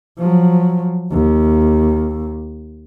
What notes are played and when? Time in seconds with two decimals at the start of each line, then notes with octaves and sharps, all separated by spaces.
0.19 F3 F#3
1.11 D#2